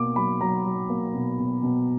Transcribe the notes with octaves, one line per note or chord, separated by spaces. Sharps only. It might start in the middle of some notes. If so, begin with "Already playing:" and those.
Already playing: B2 A#3 D6
F#3 B5
F#3 A#5
F#3
A#3
B2
B2
B2